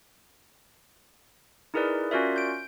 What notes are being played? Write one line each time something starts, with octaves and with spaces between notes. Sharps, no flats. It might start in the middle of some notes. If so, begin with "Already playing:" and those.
D#4 E4 G#4 A#4 B4 D5
C#4 F4 F#4 A#4 D5 E5
G6 D7